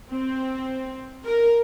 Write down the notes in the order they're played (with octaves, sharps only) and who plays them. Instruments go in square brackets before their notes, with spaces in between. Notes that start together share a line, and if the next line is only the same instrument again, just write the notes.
[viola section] C4
A#4